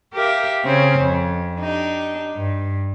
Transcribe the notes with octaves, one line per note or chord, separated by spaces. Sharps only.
G4 A#4 E5 F5
C#3 C4 C#4
F2
D4 D#4 G4
G2